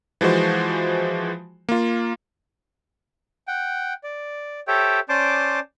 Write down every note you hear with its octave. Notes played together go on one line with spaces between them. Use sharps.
E3 F3 G#3 F#4 C5
A#3 F4
F#5 G5
D5
G4 A4 C5 C#5 E5 G5
C#4 C5 D5 A5 C6 D6